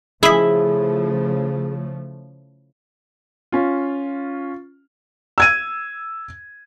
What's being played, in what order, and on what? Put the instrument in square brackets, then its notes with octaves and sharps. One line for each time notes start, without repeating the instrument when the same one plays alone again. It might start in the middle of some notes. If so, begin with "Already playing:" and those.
[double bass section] C#3 F3 A3 [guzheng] E4 E5 [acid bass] G#4
[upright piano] C#4 F4
[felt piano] E6 G#6 D#7